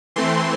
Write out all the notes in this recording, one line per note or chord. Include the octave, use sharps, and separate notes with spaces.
E3 A3 C4 C6